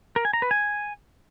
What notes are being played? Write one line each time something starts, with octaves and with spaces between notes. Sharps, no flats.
A#4
G#5
A#5
B4
G#5